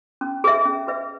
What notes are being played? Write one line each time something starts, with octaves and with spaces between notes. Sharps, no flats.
C#4
G#4 B4 E5
C#4
G#4 B4 E5